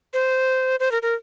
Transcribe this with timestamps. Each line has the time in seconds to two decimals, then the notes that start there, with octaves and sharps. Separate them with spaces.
0.14 C5
0.80 C5
0.92 A#4
1.02 A#4